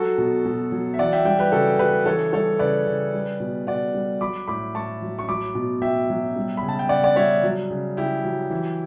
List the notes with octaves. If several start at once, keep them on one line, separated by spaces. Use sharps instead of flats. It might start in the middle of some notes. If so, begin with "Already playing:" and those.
Already playing: F#3 F#4 A4
B2
B2
F#3
E5
E3 D5 F#5
E5 G5
G3 E5 G5
G4 B4
C#3 F#4 A4
C#3 G4 B4
E3 A4 C#5
G3 A4 C#5
C#3 B4 D5
C#3
G3
B2
B2 D5 F#5
G3
F#3 B5 D6
A2 B5 D6
A2 A5 C#6
F#3
C#6
F#3 B5 D6
B2
B2 E5 G5
F#3
G3
B5
C#3
A5
G5
C#3 D5 F#5
D5 F#5
G3 C#5 E5
F#3
C#3
C#3 E4 G4
F#3
E3